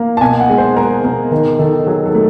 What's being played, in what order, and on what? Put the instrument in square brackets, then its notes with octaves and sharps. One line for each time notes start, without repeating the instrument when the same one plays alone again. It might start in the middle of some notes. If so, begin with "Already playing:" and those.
Already playing: [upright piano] A#3
A5
B2 G#5
F#5
G#3
C5
G#3 A#4
B2 A#4
D#3 A#4
D#3 A4
F#3 G#4
A4
A3